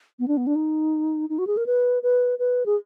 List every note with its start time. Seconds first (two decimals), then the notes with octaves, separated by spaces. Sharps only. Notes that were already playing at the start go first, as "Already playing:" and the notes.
0.19 B3
0.28 D4
0.37 B3
0.47 D4
0.55 D#4
1.29 D#4
1.38 F#4
1.47 G#4
1.57 A#4
1.66 B4
2.03 B4
2.39 B4
2.66 G#4